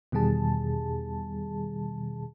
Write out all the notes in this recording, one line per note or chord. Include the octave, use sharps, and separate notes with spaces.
E2 B2 D#3 G3 G#4 A5